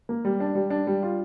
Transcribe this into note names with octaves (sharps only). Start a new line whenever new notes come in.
A#3
G3
D4
G3
D4
G3
F4